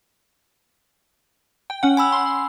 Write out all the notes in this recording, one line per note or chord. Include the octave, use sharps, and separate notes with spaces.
G5
C#4 F#5
G#5 B5 E6
C6